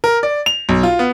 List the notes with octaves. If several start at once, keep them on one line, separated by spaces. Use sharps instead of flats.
A#4
D5
F7
B1
F4
B3